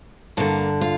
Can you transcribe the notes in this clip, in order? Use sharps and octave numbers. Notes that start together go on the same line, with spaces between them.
G2 D3 A#3
F4